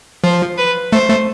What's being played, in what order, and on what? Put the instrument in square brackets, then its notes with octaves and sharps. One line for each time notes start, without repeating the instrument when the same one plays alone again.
[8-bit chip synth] F3 [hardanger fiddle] C5
[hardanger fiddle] B4
[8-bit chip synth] A3 [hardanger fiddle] C5
[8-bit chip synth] A3